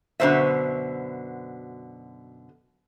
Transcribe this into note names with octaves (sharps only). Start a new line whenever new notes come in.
F#2 B2 D3 D#3 C5 E5